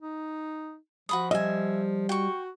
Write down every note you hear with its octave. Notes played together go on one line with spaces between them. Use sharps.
D#4
F3 F#4 B5 D#6
G3 D#5 E5 G#5
F#4 G5 C#6